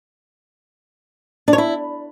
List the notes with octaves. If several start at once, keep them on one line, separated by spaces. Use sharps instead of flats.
D4
C#5
E4